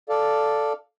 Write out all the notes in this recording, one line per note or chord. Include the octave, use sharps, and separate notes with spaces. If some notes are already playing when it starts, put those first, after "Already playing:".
A4 D5 F5